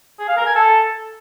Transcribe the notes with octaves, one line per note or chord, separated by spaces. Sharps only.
G#4
F5
A#4
G#5
A4